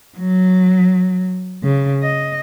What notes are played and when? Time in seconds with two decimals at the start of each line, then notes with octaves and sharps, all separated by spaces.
0.18 F#3
1.63 C#3
2.03 D#5